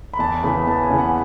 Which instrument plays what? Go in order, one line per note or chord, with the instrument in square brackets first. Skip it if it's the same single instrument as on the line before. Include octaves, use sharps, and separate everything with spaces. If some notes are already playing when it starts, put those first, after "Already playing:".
[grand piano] B5
E2 A5
C#3 E3 B3 B5
E2 A5
G#5
C#3 E3 B3
F#5